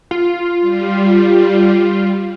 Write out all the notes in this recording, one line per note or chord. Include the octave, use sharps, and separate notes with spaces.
F4
G3